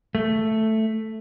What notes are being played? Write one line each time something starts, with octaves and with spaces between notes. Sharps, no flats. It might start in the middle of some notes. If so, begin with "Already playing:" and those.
A3